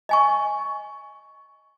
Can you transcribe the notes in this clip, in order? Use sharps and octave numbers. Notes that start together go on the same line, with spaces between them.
D#5 G#5 C#6